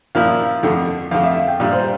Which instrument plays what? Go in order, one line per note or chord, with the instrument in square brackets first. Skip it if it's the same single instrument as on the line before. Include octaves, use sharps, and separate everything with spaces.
[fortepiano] A#2 F3 A#3 E4 [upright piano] F5
[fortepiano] F2 D3 A3
[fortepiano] F2 D3 A3 [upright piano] F5
[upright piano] E5
F5
G5
[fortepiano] A#2 G3 D4 [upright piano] F5
[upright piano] C5